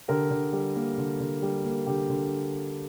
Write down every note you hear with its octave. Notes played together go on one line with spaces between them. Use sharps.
D3 G4 A#4
D3
G3
A#3
D3
D3
G3
A#3
D3 G4
D3